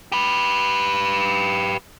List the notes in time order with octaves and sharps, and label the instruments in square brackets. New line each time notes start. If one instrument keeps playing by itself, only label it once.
[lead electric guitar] G4 B4